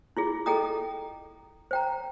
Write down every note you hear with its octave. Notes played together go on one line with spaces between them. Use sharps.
E4 F4 G#4
G#4 A4 D#5 G5 A#5 D#6
C5 G5 A#5